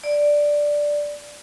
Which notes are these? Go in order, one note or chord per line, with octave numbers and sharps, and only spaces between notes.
D5